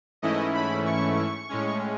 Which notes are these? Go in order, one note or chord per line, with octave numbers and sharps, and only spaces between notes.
G#2 E3 A3 C#4 E4 D#5
B5
C#6
A2 G#3 C#4